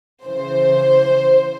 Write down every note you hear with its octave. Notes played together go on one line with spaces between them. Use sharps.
C#3 E3 C5